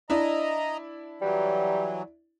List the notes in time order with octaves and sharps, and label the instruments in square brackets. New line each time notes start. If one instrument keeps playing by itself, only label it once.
[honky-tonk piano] D4 E4 [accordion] D#5 A#5
[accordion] E3 F#3 [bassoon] G3